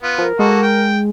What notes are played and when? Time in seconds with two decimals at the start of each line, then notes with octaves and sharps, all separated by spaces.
0.03 B3 F4
0.18 F3 A#4
0.39 G#3 A#3 F#4 A4
0.63 G5